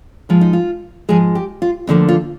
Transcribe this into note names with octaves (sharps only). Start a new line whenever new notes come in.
G#2 F3 G#3 F4
D#4
F4
G#2 F3 G#3 G#4
G4
F4
D2 D3 F3 A#3 D#4
F4